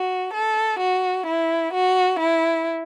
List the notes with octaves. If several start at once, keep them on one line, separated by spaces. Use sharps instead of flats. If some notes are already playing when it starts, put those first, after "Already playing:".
Already playing: F#4
A4
F#4
E4
F#4
E4